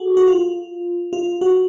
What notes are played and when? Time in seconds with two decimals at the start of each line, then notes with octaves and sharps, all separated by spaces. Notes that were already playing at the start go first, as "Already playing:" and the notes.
Already playing: F#4 G#4 A4
0.17 F#4
0.28 F4
1.13 F4
1.41 F#4